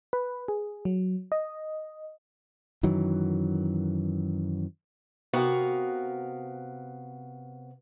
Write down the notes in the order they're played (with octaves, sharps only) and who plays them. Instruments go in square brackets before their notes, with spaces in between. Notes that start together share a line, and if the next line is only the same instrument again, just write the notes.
[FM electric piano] B4
G#4
F#3
D#5
[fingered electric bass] F#2 D#3 E3 F#3
[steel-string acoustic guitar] C3 B3 F#4 A#4 F5